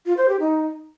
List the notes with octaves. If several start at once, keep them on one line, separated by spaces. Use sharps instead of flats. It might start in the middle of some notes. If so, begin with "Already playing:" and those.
F4
C5
G4
D#4